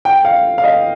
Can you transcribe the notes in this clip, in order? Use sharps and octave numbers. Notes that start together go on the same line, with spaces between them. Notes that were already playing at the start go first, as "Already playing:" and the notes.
G5
F5
F5
D#5